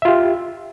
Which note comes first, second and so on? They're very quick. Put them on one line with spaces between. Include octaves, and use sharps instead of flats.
E5 F4 G4